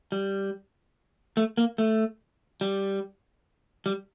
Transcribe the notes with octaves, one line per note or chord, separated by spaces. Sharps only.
G3
A3
A#3
A3
G3
G3